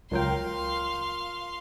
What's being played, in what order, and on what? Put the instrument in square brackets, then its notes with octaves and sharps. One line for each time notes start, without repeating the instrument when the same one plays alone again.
[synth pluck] C#2 F#3 G5 [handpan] F4 A#4 [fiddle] F5 C6